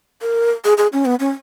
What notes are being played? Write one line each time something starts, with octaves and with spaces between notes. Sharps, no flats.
A#4
G#4
G#4
C#4
B3
C#4